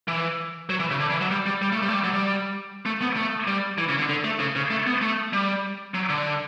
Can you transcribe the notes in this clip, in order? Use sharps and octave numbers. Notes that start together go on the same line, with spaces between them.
E3
F#3
E3
C#3
D3
E3
F#3
G3
G3
G3
A3
G3
A3
G3
F#3
G3
A3
B3
A3
G3
E3
C#3
D3
D3
A3
C#3
C#3
A3
B3
A3
G3
F#3
D3